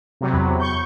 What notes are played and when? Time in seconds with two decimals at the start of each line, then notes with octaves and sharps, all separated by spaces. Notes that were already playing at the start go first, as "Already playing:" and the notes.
0.21 C3 F#3
0.33 E2 B5
0.60 C#6 G6